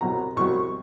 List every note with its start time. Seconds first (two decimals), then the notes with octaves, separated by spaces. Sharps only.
0.01 C2 B2 F#3 A#5
0.36 C2 B2 F#3 C#6